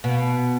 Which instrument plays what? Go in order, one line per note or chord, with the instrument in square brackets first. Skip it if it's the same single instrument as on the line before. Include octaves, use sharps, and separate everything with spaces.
[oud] B2